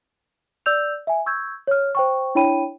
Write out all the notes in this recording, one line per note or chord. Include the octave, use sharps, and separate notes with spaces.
D5 E6 G6 F7
E5 G#5
C#6 E6 G6 G#6
C#5 F6
C5 G5 C#6
D4 E4 C#5 G5 B5 D#7